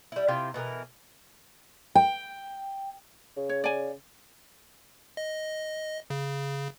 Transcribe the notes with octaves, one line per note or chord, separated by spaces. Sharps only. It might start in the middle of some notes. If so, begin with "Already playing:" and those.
G3 E4
C3 E4 F4 G5
B2 E3 G#4 A#4
G5
C#3
C#5
D5 G#5
D#5
C#3